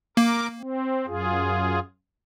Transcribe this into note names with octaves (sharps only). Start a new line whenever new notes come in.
A#3 A#4 D6
C4
F#2 F4 G#4